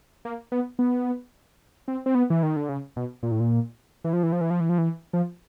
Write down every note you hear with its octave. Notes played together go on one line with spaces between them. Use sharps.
A#3
B3
B3
C4
C4
B3
E3
D#3
D3
C#3
B2
A#2
A2
A#2
E3
F3
E3
F3
E3
F3
E3
F3
E3
F3